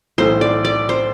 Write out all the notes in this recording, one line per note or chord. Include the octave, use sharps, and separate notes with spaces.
B1 A2 E3 C5
D5
D5
C5